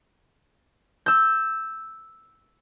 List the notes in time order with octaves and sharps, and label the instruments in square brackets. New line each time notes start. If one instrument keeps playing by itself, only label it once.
[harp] E6 G6